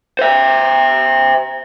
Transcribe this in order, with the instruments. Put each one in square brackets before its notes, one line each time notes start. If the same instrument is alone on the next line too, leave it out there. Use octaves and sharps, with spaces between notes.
[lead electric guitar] C5 E5